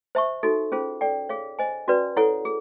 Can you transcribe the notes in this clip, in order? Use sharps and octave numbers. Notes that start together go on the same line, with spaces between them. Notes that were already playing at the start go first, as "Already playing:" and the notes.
C5 E5 A5 C#6
D#4 F#4 A4
C#4 F4 G#4 C5
A4 D5 G5
G#4 C#5 F5
C5 D#5 G#5
C#4 F#4 B4 D5
E4 A4 C#5 F#5
G#4